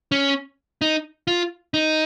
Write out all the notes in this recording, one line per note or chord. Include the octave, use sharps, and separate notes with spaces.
C#4
D#4
F4
D#4